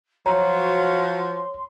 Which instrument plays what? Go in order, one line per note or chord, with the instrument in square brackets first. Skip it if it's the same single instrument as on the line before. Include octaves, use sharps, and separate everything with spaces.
[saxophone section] F3 F#3 [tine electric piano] C#5 [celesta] A#5 [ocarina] C6